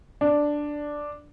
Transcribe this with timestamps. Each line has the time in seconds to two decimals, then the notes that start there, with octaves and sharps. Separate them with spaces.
0.21 D4